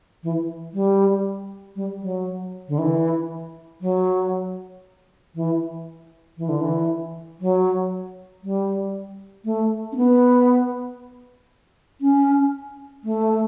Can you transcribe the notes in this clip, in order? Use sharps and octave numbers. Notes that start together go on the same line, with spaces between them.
E3
G3
G3
F#3
D3
E3
F#3
E3
E3
D3
E3
F#3
G3
A3
C#4
B3
C#4
A3